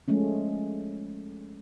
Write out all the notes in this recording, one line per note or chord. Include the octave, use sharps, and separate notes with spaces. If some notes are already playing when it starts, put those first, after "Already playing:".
F3 G#3 A3 C#4